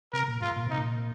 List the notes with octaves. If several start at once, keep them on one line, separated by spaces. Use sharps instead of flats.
C3 A#4
A#2
G#2 F4
A#2
C3 D#4
A#2